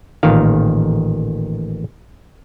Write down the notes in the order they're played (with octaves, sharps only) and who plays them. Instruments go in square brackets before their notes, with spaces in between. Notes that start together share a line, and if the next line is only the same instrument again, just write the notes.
[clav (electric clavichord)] A1 A#2 D#3 F5